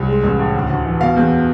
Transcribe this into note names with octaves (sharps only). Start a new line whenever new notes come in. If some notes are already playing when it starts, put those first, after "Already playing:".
Already playing: C2
G#3
A1
A2
D2
D2
E3
B2 F5
E2